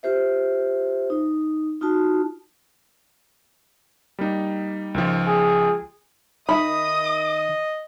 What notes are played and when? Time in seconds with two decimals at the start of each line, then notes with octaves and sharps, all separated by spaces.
0.03 F4 G4 C5 E5
1.10 D#4
1.81 D#4 F4 F#4 A5
4.19 G3 A#3 D#4
4.94 C#2 D#3 F3
5.27 G#4
6.49 D#3 D#5 E5 B5 D#6